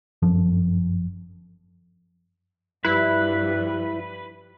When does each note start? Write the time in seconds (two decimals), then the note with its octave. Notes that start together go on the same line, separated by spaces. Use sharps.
0.22 G1 F#2 F3
2.85 G2 F3 G3 E4 B4